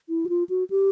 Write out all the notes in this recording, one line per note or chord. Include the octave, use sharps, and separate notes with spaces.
E4
F#4
F4
F#4
G4